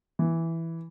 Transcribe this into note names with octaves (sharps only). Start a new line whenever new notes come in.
E3